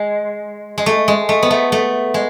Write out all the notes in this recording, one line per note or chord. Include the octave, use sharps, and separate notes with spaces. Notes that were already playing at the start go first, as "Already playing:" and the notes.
Already playing: G#3
G#3
A3
G#3
A3
B3
A3
A3
G#3